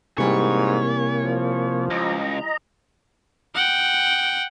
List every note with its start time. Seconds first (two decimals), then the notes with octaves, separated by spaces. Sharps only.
0.18 G#2 C3 E3 G3 A#3 C#5
1.25 F3
1.90 C#2 D#5 A#5
3.55 F#5 G5